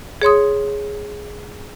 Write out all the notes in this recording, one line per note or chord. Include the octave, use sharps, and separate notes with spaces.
G#4 C#5 C6 D#6